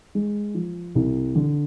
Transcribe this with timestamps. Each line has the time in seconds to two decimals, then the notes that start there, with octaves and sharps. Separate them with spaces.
0.15 G#3
0.55 F3
0.95 C2
1.35 D3